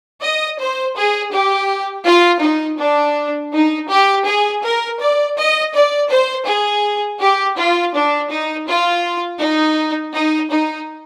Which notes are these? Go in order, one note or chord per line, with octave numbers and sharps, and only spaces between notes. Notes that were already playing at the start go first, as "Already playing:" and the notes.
D#5
C5
G#4
G4
F4
D#4
D4
D#4
G4
G#4
A#4
D5
D#5
D5
C5
G#4
G4
F4
D4
D#4
F4
D#4
D#4
D#4